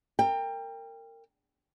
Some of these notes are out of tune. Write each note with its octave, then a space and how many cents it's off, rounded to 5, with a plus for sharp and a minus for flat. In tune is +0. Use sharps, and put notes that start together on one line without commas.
A#4 -25 G5 +20